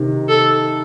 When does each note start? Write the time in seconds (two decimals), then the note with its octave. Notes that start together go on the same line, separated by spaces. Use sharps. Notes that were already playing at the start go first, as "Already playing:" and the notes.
Already playing: C3 D#3
0.29 A4